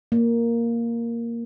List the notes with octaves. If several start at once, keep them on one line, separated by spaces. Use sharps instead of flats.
A#3